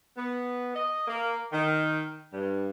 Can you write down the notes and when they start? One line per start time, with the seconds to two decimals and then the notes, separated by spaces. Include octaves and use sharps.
0.17 B3
0.75 D#5
1.07 A#3
1.52 D#3
2.32 G2